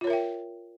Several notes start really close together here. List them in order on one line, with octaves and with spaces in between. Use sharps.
F4 C#5 A#4 E5 G5